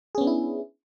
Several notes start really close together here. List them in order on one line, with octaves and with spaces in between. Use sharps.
G#4 C#4 B3 D4 E4